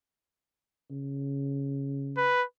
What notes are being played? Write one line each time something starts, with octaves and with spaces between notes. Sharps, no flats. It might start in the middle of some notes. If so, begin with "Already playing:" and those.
C#3
B4